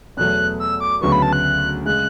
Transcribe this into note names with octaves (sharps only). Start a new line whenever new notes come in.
E2 B2 F#3 A3 F#6
E6
D6
D2 C#3 F#3 B3 C#6
B5
A5
F#6
C#3 G#3 F#6